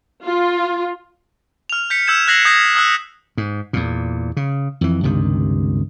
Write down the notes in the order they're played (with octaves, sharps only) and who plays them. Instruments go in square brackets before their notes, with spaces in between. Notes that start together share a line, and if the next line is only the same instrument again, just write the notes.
[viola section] F4
[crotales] F6 F7
G6 B6 C#7
E6 G6 G#6 E7
F#6 G#6 A#6 C7 F#7
D#6 G6 G#6 A#6 B6 C#7
D#6 E6 F#6
[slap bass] G#2
E2 A#2
C#3
F2 E3
C#2 G2 C3 D#3